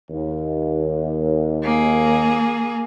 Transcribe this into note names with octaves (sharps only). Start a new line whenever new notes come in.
D#2
A#3 G#4